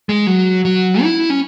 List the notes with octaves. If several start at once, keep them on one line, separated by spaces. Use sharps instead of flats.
G#3
F#3
F#3
E4
C#4